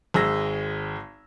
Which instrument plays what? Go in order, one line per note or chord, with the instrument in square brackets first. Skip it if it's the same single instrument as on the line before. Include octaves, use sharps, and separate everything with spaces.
[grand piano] G#1 G#3 E6 A#6